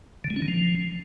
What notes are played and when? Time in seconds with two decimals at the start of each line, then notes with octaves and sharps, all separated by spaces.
0.24 D3
0.30 G#3
0.36 C#4
0.42 D#3
0.48 F3